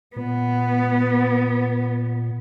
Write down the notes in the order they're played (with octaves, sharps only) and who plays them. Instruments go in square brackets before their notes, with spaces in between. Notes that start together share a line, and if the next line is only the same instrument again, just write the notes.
[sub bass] A#2 [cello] B3